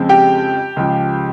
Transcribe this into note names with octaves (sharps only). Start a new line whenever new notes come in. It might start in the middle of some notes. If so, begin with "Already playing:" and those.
Already playing: F2 C#3 G#3 C4
G4 G5
C#2 C#3 F3